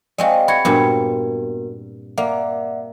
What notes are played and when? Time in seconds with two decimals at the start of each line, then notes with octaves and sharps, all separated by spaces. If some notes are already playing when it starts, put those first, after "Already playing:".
0.18 G#3 C4 F#4 D5 D#5 F5
0.48 F#4 B5 G#6 C#7
0.65 G2 A#2 B3 C4 F#4 A#4
2.18 A#3 D5 E5 F#5